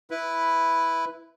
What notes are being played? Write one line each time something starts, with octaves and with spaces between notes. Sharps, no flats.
E4 B4